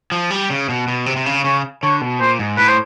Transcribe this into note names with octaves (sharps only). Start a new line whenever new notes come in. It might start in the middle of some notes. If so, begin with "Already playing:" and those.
F3
G3
C#3
B2
B2
C3
C3
C#3
C#3 C#5
D3 C#5
B2
A#2 C5
G#2
A2 B4
C5